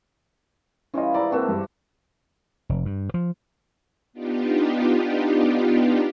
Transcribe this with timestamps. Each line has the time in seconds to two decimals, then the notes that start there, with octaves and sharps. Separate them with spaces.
0.94 E3 G3 C#4 F4 D#5
1.14 G#2 E4 D5 F5 A#5
1.31 A#3 C4 D4 F#4 B4 E5
1.49 G2
2.69 F1
2.85 G2
3.14 F3
4.13 B3 D4 D#4 F4 G4